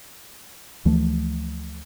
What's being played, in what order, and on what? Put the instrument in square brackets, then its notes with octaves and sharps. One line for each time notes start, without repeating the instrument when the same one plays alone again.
[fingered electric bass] D2 E3 F3 A3